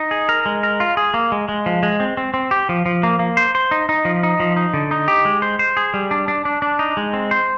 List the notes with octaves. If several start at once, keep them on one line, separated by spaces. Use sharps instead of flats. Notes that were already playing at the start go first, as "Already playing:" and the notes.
Already playing: D#4
G#4
A#4
G#3
A#4
F4
G#4
A#3
G#3
G#3
F3
G#3
C4
C4
C4
G4
F3
F3
A#3
A#3
C5
C5
D#4
D#4
F3
D#4
F3
D#4
D3
D#4
G4
G#3
C5
C5
G#4
G3
D4
D4
D4
D4
D#4
G#3
C4
C5